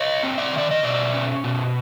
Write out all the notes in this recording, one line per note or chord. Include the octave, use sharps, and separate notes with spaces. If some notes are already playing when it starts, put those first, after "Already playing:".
Already playing: C#5 D#5
C4
D5 E5
D#3 D5
D#5
B2 D5 E5
C#4
B2